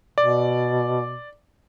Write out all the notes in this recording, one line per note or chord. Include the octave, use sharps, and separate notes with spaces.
B2 D5